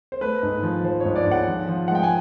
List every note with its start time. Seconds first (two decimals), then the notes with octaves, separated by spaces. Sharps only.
0.12 C5
0.21 A3 B4
0.43 G#2
0.63 F3
0.84 F3 C5
1.00 G#2 C#5
1.16 D5
1.27 G#2 F#5
1.47 F3
1.69 F3
1.88 G#3 F#5
1.95 G5
2.03 G#5